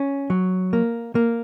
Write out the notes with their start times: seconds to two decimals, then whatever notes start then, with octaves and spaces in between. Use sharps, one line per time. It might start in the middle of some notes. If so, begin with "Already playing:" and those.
Already playing: C#4
0.30 F#3
0.73 A#3
1.15 A#3